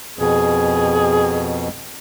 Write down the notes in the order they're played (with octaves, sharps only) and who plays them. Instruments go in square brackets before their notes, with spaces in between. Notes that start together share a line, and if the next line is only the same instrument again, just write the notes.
[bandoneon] F2 B2 [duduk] G#4